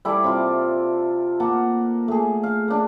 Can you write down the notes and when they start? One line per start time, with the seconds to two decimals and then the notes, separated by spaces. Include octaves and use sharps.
0.05 G3 E4 A4 D5
0.24 C3 F4
1.40 A#3 A#4 F#5 A5
2.08 A3 G#4
2.43 F5
2.68 A#3 D4